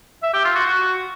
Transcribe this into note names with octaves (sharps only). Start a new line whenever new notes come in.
E5
G4
F4
F#4
F#4